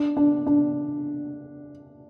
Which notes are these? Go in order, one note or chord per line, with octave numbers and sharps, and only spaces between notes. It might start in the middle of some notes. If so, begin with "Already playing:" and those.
Already playing: D4
D4
D4